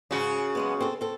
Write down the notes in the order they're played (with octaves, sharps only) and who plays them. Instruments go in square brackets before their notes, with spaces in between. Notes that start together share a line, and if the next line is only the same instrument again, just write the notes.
[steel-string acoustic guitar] G#2 [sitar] C#3 F#4
[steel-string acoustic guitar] F#3 G#3 B3
C4 A4
C4 A4